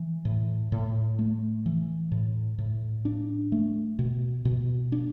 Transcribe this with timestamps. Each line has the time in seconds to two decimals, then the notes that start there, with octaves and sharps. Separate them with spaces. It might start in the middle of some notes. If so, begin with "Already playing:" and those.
Already playing: E3
0.25 A2
0.72 A2
1.19 A3
1.66 E3
2.12 A2
2.59 A2
3.05 D4
3.52 A3
3.99 B2
4.45 B2
4.92 D4